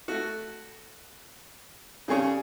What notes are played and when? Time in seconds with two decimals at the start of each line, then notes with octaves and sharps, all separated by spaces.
0.08 A3 F#4
2.08 C#3 G3 G#4 C#5